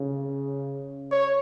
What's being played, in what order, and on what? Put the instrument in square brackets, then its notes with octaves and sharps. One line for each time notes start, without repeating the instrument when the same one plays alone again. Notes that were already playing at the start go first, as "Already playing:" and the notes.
Already playing: [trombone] C#3
[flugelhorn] C#5